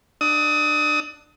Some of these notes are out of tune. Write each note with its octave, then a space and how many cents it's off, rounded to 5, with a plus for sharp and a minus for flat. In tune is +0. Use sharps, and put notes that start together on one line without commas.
D4 +25 D#6 +30